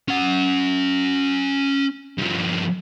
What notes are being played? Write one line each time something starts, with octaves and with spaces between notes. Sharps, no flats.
C#4 F#5
G2 F3